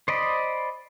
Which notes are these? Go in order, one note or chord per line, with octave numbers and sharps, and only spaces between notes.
C5 D5 D#5 B5